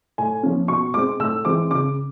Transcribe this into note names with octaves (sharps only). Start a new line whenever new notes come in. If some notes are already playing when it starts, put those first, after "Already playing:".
A2 G#5
F3 A#3 C#4
B2 C#6
G#3 C4 D6
A2 E6
E3 G#3 C4 D6
C#3 D6